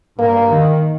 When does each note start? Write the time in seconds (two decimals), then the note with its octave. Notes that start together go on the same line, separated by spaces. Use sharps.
0.18 G2 A#3
0.51 D#3